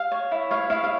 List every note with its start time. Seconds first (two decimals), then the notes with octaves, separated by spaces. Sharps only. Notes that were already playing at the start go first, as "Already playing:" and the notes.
Already playing: F5
0.12 C#5
0.32 E4
0.51 C#5 F5
0.70 E4 F5
0.84 F5